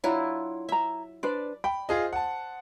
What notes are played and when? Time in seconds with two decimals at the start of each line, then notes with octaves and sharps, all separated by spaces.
0.04 F#3 D4 E4 F4 A#5
0.69 E4 E5 A#5
1.23 D4 B4 C5 D5
1.64 G5 B5
1.89 F4 G#4 C5 D#5
2.13 F#5 A5